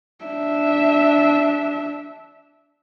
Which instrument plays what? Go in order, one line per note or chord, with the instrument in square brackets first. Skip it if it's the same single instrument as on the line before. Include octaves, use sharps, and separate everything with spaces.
[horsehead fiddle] D4 E5